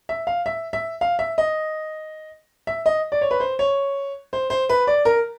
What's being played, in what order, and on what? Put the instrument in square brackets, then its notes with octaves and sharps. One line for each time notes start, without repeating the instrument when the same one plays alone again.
[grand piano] E5
F5
E5
E5
F5
E5
D#5
E5
D#5
D5
C#5
B4
C5
C#5
C5
C5
B4
D5
A#4